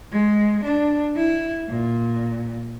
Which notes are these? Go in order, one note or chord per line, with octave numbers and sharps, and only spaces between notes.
G#3
D4
E4
A#2